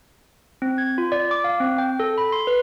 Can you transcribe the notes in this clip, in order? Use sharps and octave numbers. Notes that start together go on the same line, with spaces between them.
C4
G#6
F4
D5
D6
F5
C4
G5
A4
B5
C6
B4